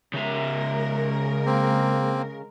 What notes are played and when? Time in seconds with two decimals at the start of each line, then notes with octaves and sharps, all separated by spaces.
0.14 C#3 G#3 A#4 E5
1.46 A#3 C4